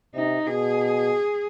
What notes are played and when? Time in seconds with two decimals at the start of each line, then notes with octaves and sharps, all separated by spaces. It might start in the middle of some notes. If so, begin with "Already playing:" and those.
0.15 C3 D#4
0.47 B2 G#4